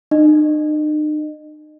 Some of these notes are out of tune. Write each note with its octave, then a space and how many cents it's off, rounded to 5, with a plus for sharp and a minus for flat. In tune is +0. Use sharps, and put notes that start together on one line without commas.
D#4 -45 D#5 -25